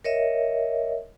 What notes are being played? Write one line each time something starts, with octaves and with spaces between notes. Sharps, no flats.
A#4 C#5 D#5 E5